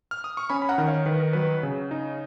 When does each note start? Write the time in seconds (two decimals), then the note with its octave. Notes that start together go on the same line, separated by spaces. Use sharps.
0.11 F6
0.24 D#6
0.37 C#6
0.50 C#4 G#5 B5
0.62 B5
0.69 F#5 A#5
0.78 D#3
0.88 C#5 F5
1.06 D#3 B4
1.20 A#4
1.33 F#3 B4
1.63 C#3
1.91 D#4